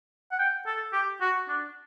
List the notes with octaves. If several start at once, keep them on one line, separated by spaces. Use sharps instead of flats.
F#5
G5
A4
G4
F#4
D4